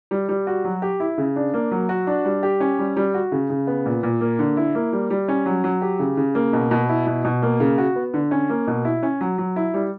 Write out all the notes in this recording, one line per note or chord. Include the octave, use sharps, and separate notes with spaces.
G3
G3
F#4
F#3
G4
E4
C#3
D4
A#3
F#3
F#4
D4
G3
G4
C#4
G3
G3
F#4
C#3
C#3
B3
A#2
A#2
A#3
D3
E4
A#3
G3
G3
C#4
F#3
F#3
G4
C#3
C#3
A#3
B2
B2
E4
B2
B2
A#3
C#3
F#4
B3
D3
C#4
A#3
B2
E4
C#4
F#3
F#3
E4
G3